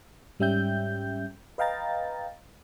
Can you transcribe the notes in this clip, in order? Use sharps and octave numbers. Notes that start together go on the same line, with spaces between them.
G#2 G3 C#4 E5 G5 G6
B4 D#5 F5 G5 A#5 A6